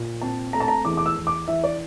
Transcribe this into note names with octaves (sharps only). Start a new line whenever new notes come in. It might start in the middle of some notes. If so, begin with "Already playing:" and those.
Already playing: A#2
C4 A5
A3 A#5
A5
A#5
E2 D6
D6
E6
E2
D6
E3 E5
D5